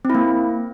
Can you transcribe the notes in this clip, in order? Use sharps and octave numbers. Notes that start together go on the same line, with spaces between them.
C4
E4
A#3